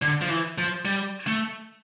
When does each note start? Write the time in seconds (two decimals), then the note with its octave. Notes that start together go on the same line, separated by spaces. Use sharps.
0.02 D3
0.21 F3
0.30 E3
0.58 F3
0.85 G3
1.27 A3